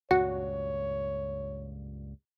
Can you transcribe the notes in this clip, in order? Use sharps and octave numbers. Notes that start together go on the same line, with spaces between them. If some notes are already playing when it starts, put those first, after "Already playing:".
C#2 G2 A#2 F#4 C#5 F#5